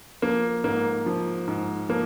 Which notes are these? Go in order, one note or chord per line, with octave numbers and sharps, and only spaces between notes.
F3 A#3
G#2 A#3
F3
G#2
F3 A#3